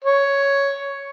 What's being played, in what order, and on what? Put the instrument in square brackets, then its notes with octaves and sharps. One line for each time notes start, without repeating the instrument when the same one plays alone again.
[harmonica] C#5